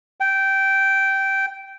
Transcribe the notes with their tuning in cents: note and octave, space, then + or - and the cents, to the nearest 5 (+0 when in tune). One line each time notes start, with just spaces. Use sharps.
G5 -15